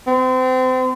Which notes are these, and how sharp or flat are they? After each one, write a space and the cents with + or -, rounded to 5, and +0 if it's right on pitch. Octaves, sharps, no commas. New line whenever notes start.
C4 -30